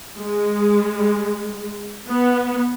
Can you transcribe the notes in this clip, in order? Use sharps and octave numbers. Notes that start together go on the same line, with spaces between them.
G#3
B3